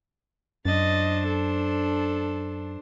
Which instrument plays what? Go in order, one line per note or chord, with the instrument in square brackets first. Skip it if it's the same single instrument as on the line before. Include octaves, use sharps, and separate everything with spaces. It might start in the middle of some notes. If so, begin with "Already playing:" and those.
[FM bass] F#2 [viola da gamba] D4 C5 [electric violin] D#5 A6
[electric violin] A4